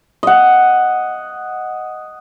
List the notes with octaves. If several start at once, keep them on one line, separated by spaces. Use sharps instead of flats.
D#5 F#5